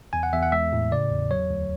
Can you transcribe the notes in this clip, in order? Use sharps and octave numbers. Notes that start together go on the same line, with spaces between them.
E2 G#5
F#5
E2 E5
F#5
G#3 E5
A2
C#3 D5
E2
F#3 C#5
D2